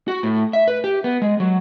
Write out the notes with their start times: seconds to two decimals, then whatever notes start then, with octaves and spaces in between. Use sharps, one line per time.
0.08 F#4
0.23 A2
0.53 E5
0.68 B4
0.84 G4
1.04 B3
1.22 G#3
1.40 F#3